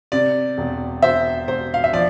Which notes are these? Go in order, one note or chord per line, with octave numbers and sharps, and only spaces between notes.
C3 D5
E1
E1 C5 E5
E1 C5
F5
E5
F3 D5